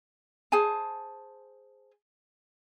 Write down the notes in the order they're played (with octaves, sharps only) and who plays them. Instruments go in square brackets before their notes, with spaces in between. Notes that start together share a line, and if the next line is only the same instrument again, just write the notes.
[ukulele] G#4 C5 G#5 A5